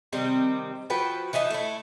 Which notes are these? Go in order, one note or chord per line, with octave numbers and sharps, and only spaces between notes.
C3 D#3 G3 C4
F3 F#4 B4 G5
E3 D#4 E5 A5
A3 E4